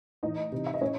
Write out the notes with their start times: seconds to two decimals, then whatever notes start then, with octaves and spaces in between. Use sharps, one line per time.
0.23 A2 E3 D#4 D#5
0.52 C3 E3
0.66 E5
0.74 D#5
0.81 A2 C#4 C#5